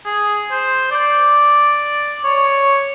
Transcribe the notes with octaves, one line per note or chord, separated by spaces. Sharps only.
G#4
C5
D5
C#5